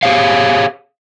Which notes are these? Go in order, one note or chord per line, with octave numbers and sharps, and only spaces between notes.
G4 G#4 C5 C#5 F5